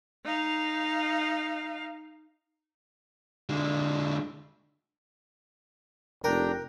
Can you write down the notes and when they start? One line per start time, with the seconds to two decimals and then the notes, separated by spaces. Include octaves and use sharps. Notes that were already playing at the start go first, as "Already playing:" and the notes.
0.24 D#4 F5
3.49 D3 G#3
6.24 F1 D4 A#4 G5 A#5